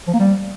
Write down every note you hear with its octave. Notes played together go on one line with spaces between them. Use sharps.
F3
A#3
G3